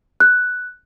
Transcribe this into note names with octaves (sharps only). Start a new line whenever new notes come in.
F#6